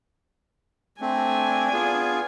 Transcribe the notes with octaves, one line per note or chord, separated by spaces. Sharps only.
A3 C4 D4 G#5
B3 F4 G#4